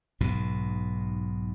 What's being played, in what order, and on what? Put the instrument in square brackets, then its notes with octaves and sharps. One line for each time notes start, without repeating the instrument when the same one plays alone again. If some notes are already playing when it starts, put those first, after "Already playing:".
[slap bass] B1 G#2 B2